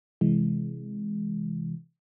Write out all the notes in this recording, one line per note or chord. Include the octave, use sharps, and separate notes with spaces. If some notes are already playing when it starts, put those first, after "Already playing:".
C3 E3 G#3